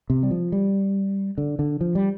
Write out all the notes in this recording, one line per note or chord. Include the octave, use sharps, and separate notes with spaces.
C3
G3
F3
G3
D3
D3
F3
G3